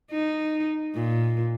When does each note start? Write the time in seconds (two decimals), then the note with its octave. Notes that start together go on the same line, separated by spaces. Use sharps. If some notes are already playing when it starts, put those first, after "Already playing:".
0.11 D#4
0.95 A#2